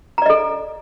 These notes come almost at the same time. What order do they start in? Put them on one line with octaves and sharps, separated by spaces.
A#5 D5 D#5 A4